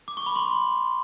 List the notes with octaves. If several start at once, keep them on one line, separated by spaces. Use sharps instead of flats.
D6
C#6
B5
C6